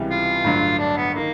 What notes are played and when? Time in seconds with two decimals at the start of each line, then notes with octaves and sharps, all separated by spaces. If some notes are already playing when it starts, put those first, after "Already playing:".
Already playing: C#2 C3 E3 G3
0.10 F4
0.44 A1 G2 D3 F#3
0.79 D4
0.97 B3
1.14 D#3 A#3